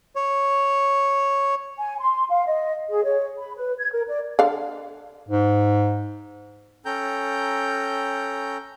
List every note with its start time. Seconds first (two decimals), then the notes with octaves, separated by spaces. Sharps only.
0.16 C#5
1.78 G#5
2.00 C6
2.30 F5
2.46 D#5
2.90 G#4
3.04 C#5
3.39 B5
3.56 B4
3.79 G#6
3.92 A#4
4.08 D5
4.39 D3 F5
5.28 G#2
6.85 C#4 A4 G5 A#5 G6